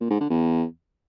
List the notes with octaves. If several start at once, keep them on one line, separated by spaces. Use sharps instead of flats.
A#2
G#2
D3
E2